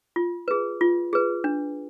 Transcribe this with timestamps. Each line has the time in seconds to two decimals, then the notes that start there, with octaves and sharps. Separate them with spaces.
0.16 F4
0.48 G#4 B4
0.81 F4
1.13 G#4 B4
1.44 D4